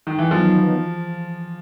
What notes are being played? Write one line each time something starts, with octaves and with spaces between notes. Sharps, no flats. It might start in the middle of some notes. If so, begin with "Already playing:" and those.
D#3
E3
D#3 F3 F#3 B3 D#4